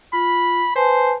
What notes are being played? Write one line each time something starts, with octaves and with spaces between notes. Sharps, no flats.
F4 B5
B4 C5 G#5 A5